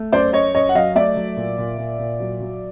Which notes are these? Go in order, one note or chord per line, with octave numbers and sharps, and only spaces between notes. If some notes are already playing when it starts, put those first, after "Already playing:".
Already playing: A3
F#2 C5 D5
F#2 C#5 D#5
F#2 C#5 D#5
F#5
F#3 D#5 F5
A3 D5 E5
F#3
A#2
A#2
A#2
A#2
F#3
F#3